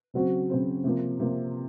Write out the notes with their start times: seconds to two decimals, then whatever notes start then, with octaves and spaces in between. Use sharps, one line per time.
0.14 C#3 F#3 C4 F#4 C5
0.50 C#3 F#3 C4 F#4 C5
0.84 C3 F3 A#3
1.20 C3 F3 A#3